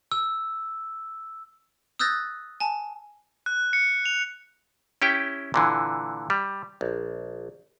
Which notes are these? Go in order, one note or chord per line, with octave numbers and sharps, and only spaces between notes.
E6
D#6 E6 F#6 G6 A6 A#6
G#5 A5
F#6
C#7
F7
C#4 E4 G4 G5
A#2 D3 E3
G3
A#1